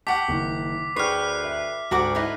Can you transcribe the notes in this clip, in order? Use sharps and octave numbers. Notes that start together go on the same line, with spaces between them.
F#5 G5 A5 C#6 D6 B6 C#7
F#1 D#3
D2 G#4 B4 C#5 D5 G5 F6 C7
E5
D2 G#2 F#4 F#5 A#5 D6
D#4 E4 B4